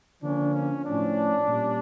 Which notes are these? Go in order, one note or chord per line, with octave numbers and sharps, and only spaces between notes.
D3 F3 A#3 C#4 D4
C#4
A2 F3 C#4 D4
A#2 G3 C#4